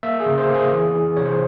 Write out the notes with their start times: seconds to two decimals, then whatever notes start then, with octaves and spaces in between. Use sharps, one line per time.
0.03 A#3 E5
0.20 G#4
0.26 C#3
0.38 C5
0.49 A#3
0.54 G#4
0.72 E3
0.95 E3
1.17 C3 C#5
1.26 C5